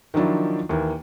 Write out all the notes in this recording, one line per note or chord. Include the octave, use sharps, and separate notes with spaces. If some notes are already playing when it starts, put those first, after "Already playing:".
D#3 F3 F#3 D4 E4
D#2 E3 A#3